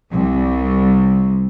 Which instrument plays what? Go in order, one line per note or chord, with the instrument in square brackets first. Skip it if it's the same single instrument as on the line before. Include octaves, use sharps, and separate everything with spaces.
[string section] C2